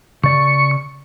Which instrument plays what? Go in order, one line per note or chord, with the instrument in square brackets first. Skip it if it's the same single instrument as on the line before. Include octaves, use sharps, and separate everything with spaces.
[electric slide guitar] C#3 D5 [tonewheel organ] C#6